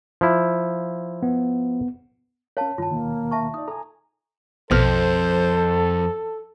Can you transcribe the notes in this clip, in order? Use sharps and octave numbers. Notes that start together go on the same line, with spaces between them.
F3 E4
B3
C#4 A#4 C#5 F5 A5
G2 D#3 F4 A5
D#2 B2 D#3 A#3
E5 A5 C#6
D#4 D5 D#6
A4 G#5 A#5
A#1 F2 B2 A4 C5 F6